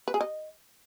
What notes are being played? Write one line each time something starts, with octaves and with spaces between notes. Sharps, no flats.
B4
G#4
D#5